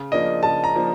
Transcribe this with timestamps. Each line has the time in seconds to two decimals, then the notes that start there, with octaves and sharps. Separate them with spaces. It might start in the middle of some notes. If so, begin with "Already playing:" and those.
Already playing: C#3
0.12 F3 A#3 D4 D#5
0.43 C#3 A5
0.64 A#5
0.74 F3 A#3 D4